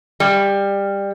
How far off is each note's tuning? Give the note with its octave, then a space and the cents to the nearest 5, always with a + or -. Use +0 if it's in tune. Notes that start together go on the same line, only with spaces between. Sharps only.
G3 +20